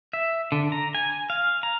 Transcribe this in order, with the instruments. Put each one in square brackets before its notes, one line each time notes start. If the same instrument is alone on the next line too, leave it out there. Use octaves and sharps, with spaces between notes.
[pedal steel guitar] E5
D3
A#5
G#5
F5
A#5